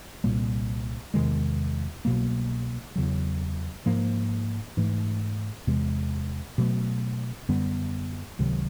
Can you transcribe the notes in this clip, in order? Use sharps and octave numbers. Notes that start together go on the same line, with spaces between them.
C2 A#2 G3 A#3
E2 C3 D#3 G#3
C2 B2 F#3 A#3
E2 C#3 F#3
G#2 F3 A#3
G#2 E3 A3
E2 C3 E3 G#3
B2 F#3 A3
F#2 D3 G3 B3
C#2 C3 D#3 F#3